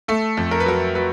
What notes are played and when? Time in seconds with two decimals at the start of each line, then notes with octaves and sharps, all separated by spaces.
0.08 A3 A4
0.37 F2
0.51 A#4
0.60 B4
0.66 F#3 A#4
0.95 F#3 B4